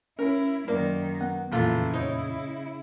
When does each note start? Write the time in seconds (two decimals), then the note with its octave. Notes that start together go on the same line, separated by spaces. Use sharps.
0.19 C#4 E4 A#4
0.68 F#2 D#3 A#3 D5
1.21 B3 F#5
1.52 A1 F2 A#2 C#3 A3 E4 F4
1.94 D#4 C#5